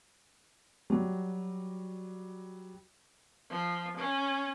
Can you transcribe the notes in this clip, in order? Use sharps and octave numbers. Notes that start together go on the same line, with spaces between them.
F#3 G3
F3
C#4